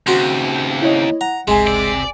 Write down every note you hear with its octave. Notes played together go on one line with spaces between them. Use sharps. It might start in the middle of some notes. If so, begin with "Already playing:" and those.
D#2 C#3 C4 F#4 C5
E4 C#5 D#5
F#5 A#5
G1 C#2 C3 G#3 G#5
D5